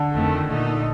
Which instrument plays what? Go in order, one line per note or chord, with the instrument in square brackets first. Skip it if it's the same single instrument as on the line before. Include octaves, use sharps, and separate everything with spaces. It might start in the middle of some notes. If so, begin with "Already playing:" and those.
Already playing: [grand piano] D3
[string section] F2 D#3 A3
A#2 A3 D#4